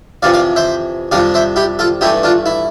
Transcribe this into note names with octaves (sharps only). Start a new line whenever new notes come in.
F2 C3 E3 D5 F5
D5 F5
C5 E5
F2 C3 G3 D4 D5 F5
C5 E5
E4 G4
F4 A4
G2 E3 A3 E4 G4
D4 F4
E4